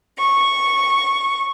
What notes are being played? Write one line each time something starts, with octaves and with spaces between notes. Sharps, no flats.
C#6